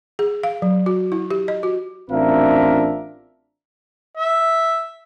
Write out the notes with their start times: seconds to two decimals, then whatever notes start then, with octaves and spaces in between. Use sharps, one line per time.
0.19 G#4
0.43 F5
0.62 F#3
0.86 F#4
1.12 E4
1.31 G4
1.48 D#5
1.63 F#4
2.11 A1 C4 D4 F4 A#4 E5
4.17 E5